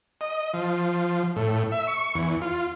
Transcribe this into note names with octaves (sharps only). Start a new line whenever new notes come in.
D#5
F3
A2
E5
C#6
E2
F4